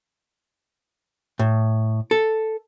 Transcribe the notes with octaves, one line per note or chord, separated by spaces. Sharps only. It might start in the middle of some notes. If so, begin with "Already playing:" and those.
A2
A4